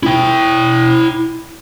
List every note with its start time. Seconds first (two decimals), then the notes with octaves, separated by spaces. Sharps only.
0.03 E4 G5